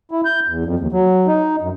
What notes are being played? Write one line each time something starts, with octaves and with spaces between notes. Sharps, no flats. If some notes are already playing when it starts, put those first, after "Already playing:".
E4
G6
E2
F2
D#2
F#3
D#4
F#2